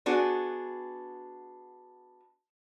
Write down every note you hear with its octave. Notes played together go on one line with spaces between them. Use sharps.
B3 D4 F#4 G#4